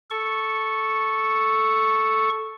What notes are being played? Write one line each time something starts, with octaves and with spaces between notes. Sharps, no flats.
A4 C#6